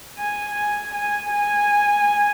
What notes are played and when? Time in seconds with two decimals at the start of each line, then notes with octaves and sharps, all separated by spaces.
0.18 G#5
0.56 G#5
0.94 G#5
1.31 G#5